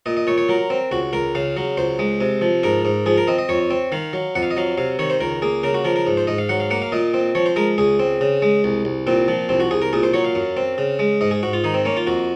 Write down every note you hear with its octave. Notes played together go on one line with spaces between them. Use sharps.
A#2 D#5
D#5
A#2 C#5
C#5
F#3 A#4
C4
C#2 F#4
C#2 A#4
C#3 F5
F#3
C#2 C5
G#3
C3
F3
G#2 A#4
G#2
F3 G#4
A#4
C4 D#5
D#5
F2 C#5
C4
D#3 F5
F#3
F2 F#5
F5
D#5
F#3 F5
C3 F5
D#3 C#5
C5
C#2 A#4
A#3 G#4
C#3 A#4
F#4
F3 A#4
A#4
G#2
C5
G#2 D#5
F5
F#3 F#5
F5
A#3 F#5
F5
A#2 D#5
C4
F3 C#5
C5
G#3 A#4
C#2 G#4
C4
C#3
G#3
C2
C2
A#2 C4
F3
C2 C4
F#4
C2 G#4
A#4
A#2 G#4
C5
F#3 C#5
F5
F#2
C4
C#3
G#3
G#2 D#5
G#4
G#2 F#4
F4
D#3 D#4
C4
A#3 C#4
F4
F2 F#4